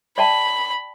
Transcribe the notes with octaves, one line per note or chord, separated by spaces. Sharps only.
D5 G5 A5 B5